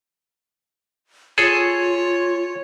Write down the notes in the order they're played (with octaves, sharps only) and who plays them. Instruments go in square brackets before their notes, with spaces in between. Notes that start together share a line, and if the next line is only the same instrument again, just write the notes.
[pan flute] F4 [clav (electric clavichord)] G#4 A4 [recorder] C#5